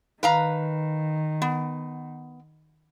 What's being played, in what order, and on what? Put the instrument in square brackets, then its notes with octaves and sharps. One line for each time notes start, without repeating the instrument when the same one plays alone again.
[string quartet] D#3 [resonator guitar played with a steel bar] B4 F5 A#5
[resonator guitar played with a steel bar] B3